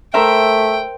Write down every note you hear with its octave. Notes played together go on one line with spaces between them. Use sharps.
A3 A#4 C5 E5 G5